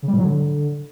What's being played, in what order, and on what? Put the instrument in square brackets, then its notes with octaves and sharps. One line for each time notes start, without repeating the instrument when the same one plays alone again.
[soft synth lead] C#3
G3
A2
F#3
D3